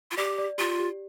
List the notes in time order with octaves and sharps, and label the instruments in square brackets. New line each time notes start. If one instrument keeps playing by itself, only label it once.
[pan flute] F4
[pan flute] G4 [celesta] D5
[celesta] D5
[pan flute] F4 [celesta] G4
[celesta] G4